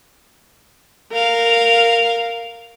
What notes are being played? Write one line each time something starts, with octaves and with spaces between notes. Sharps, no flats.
A#4 F5